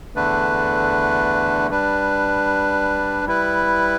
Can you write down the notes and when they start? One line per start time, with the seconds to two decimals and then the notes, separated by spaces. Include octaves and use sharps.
0.15 E2 D3 A3 D4 B4
1.70 G3 D4 B4
3.25 G3 E4 B4